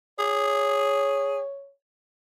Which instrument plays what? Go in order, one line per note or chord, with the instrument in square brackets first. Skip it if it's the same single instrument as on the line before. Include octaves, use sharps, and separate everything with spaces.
[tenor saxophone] G#4 [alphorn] C#5